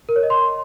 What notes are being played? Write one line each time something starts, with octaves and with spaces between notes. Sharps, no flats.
A#4
C#5
D#5
C6